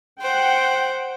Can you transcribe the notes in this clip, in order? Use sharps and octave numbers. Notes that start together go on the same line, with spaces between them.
C5 F#5 G5